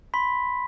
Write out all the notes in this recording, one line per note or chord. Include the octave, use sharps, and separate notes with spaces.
B5 C6 B6